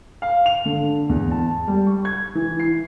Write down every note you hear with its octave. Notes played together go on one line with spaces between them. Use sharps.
F5
F7
D3
E2
A5
G3
C#6
G#6
E3
C7